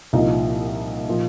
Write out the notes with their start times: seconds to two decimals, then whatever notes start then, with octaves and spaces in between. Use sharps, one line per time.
0.13 C2 A#2 F3 D#4
1.09 A#2 F3